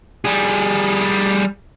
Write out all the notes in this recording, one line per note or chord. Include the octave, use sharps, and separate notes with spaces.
G3 G#4